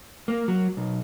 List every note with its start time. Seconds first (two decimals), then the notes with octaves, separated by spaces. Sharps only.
0.28 A#3
0.48 F#3
0.77 B1